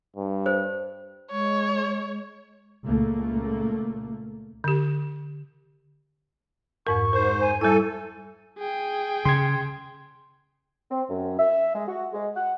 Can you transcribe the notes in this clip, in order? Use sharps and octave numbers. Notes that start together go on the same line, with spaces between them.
G2
C5
G#3 C#5
C#2 A#2 A3 A#3
D3 G4
F2 G#2 A#4 C#6
G#2 A#4 C5
G#5
G3 E4 A4 G#5
G#4 G5
C#3 C6 G#6
C4
F#2
E5
G#3
F#4
G#3
F#5